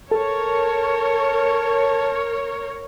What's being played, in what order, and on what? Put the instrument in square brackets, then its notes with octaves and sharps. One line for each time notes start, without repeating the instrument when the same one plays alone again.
[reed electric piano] A4 [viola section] A#4 C#5 [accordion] A5